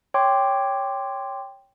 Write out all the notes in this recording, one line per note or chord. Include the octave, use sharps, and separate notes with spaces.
C#5 G5 C6 D6